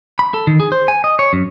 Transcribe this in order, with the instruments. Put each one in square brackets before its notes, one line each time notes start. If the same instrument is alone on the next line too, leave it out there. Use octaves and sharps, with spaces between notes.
[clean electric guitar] B5
A4
D#3
G#4
C5
G#5
D#5
C#5
F#2